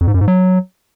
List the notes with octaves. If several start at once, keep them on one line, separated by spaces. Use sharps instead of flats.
F2
G#2
F#2
G#2
F#3